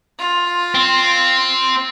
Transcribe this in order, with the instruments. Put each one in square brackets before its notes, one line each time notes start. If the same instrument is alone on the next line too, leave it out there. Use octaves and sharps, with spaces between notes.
[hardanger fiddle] F4
[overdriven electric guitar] C4